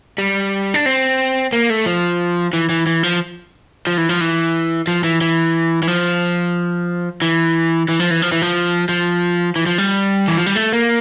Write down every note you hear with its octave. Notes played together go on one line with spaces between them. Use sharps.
G3
D4
C4
A#3
A3
F3
E3
E3
E3
F3
F3
E3
F3
E3
F3
E3
E3
E3
F3
E3
E3
F3
E3
F3
E3
F3
F3
E3
F3
G3
E3
F3
G3
A3
A#3